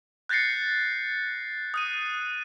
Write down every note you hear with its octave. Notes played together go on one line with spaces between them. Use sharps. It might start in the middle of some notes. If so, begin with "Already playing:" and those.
F#6 G6 A6 A#6 C7 C#7
D#6 F#6 D#7